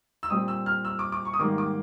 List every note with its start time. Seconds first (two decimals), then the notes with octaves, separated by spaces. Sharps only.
0.23 E6
0.30 A#2 G3 C4 D#6
0.48 E6
0.66 F6
0.85 E6
0.99 D6
1.12 D6
1.25 C#6
1.33 D#6
1.39 G#2 D#3 G3 A#3 D6
1.58 D6